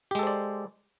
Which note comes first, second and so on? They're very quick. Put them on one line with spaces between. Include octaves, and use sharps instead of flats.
G4 G#3 A4 C5 D5